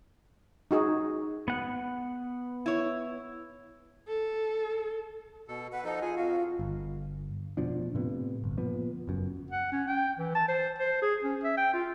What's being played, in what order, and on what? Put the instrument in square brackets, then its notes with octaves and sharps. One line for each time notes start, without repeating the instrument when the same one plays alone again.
[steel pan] D#4 F#4 G#4
[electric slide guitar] B3 F#5
[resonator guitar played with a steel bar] E4 C#5
[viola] A4
[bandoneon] B2 A4
[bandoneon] B4 [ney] F#5
[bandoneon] F3 D#4 A4 [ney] D#5
[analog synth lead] F4 [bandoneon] G#4 G#5
[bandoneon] F2 F#4 [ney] F5
[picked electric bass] G1
F1 B2 F3 D4
A2 C3 B3
G1
A#2 F3 B3
F#1 F#2
[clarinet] F#5
C#4
G5
E3
A5
C5
C5
G#4
C#4
E5
G5
F4